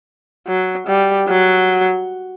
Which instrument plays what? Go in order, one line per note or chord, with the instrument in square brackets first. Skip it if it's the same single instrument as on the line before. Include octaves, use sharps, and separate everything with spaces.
[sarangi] F#3
G3
F#3